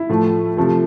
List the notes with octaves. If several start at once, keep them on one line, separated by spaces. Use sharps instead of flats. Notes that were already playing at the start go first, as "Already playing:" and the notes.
Already playing: E4
A2 F3 A3
C3 F3 A3